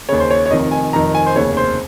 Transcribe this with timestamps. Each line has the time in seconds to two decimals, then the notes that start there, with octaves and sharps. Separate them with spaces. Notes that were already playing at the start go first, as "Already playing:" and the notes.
0.08 D#2 C#3 C#5
0.20 C5
0.31 C#5
0.46 C#5
0.50 F1 F2 D#3 D#5
0.72 G#5
0.93 F1 F2 D#3 A#5
1.15 G#5
1.26 C5
1.36 F1 D#2 C#3 C#5
1.57 C5